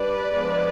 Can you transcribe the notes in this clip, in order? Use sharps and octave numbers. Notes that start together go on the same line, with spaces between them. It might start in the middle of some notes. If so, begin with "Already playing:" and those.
Already playing: G3 D4 B4 D5
F3 G#3 B3 D4